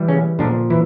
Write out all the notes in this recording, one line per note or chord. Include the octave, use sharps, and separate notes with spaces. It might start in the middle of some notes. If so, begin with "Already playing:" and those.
Already playing: E3 G3
C#3 C#4
A#2 D3 F3 D4
E3 E4